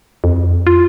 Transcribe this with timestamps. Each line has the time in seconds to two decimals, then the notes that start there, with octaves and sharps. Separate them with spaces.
0.24 F2
0.67 F4